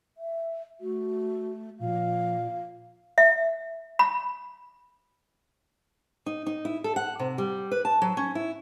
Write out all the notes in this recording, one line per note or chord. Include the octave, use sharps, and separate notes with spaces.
E5
A3 F#4
A#2 F3 F5
E5
B5
D#4
D#4
E4
A4
F#5
C3
G3
B4
A5
F#3
C#4
E4